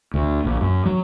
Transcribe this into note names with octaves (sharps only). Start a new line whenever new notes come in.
D2
A#1
F#2
F#3